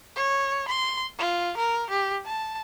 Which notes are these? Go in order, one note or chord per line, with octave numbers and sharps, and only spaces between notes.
C#5
C6
F4
A#4
G4
A5